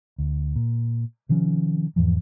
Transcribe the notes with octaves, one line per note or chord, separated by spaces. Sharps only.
D2
A#2
C3 D#3 F3 C#4
E2 G#2 E3 F3